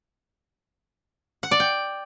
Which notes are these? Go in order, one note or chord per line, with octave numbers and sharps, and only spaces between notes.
F#5
D5
G5